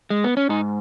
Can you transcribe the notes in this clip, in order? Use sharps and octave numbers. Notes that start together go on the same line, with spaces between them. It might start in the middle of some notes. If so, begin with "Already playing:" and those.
G#3
B3
C#4
G#2 D#4